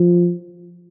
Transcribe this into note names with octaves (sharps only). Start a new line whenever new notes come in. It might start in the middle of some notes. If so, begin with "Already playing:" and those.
Already playing: F3